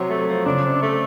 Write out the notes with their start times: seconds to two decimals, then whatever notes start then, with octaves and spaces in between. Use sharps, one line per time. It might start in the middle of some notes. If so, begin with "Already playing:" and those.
Already playing: C3 F#3
0.09 A3
0.27 F3
0.46 C#3 D4
0.64 C3
0.82 A3